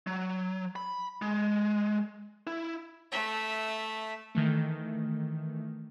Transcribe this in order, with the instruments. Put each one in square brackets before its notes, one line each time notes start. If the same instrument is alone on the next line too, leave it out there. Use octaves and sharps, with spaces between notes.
[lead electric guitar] F#3
B5
G#3
E4
[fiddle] A3 E5
[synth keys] D#3 E3 A3